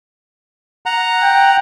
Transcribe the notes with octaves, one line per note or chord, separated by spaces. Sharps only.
F#5 A#5
G5